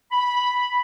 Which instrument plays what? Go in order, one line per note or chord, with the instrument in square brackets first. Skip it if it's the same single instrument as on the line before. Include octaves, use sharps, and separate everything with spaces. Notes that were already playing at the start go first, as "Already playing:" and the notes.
[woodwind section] B5